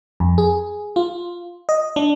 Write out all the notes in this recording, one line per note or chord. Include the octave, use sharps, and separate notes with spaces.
F2
G#4
F4
D#5
D4